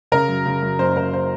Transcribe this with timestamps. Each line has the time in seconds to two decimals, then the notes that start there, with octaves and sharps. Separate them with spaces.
0.12 C#3 A#4
0.28 F#2
0.46 C#3
0.62 F#2
0.79 F#1 C5
0.96 C#3 A#4
1.14 C5